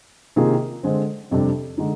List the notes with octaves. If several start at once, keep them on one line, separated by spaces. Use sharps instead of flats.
C3 D#3 A#3 F4 G#4
D3 G#3 C4
F2 C3 G3 D4 G4
D3 G#3 D#4